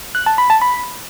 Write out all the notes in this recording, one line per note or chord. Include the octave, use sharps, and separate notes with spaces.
F#6
A5
B5
A5
B5